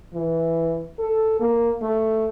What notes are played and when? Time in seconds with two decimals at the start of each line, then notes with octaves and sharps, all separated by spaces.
0.14 E3
0.99 A4
1.40 A#3
1.82 A3